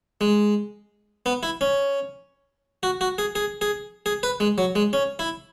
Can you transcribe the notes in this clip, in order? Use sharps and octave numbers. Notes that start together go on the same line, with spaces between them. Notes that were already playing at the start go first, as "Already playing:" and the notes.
G#3
B3
E4
C#4
F#4
F#4
G#4
G#4
G#4
G#4
B4
G#3
F#3
G#3
C#4
E4